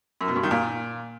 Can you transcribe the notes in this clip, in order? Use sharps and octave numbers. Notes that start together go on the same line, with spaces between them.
F#2
B2
G2
D#3
A#2